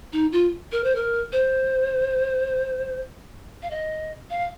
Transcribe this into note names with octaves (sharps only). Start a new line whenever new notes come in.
D#4
F4
A#4
C5
A#4
C5
F5
D#5
F5